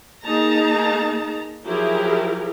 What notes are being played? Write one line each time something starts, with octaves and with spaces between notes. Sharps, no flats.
A#3 D#4 G#4 A5 A#5
F3 F#3 E4 G4 G#4 A#4